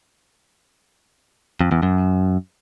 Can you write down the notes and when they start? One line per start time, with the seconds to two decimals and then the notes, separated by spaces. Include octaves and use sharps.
1.61 F2
1.72 E2
1.82 F#2